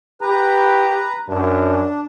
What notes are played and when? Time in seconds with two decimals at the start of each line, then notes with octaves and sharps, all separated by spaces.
0.21 G4 B4 A#5
1.28 F#2 D4